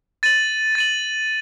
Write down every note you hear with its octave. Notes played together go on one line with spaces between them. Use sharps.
A6 D#7 F#7
A6 D#7 F#7